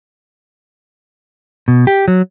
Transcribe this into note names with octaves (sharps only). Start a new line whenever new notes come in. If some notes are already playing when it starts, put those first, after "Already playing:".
B2
G4
F#3